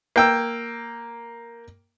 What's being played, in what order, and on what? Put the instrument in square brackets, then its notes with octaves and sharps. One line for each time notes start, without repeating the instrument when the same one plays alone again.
[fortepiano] A#3 G5 E6